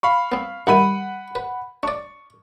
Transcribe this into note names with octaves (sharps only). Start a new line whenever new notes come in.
F5 B5 C#6
B3 C4
G2 D#3 E4 F#5 B5 D#7
B4
D4 D5 C#6